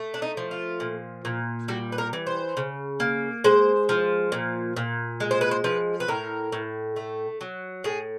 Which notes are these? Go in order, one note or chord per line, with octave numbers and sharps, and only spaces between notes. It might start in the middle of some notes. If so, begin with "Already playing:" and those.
Already playing: A3
D4
D#4
F3
F4
A#2
A#2
G3 F#4
B4
A#4
E3
C5
C#3
A#3
G#3 C5
F3
A#2
A#2
G#3
C5
B4
C5
F3 B4
B4
A2 A#4
A2
A3
F#3
A2 G#4